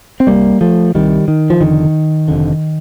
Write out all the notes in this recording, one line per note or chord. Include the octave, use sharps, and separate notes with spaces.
C4
C2 C3 G3 A#3
F3 A3
C2 C3 D#3 G3
D#3
F3
F1 F2 D3 D#3
F1 F2 D3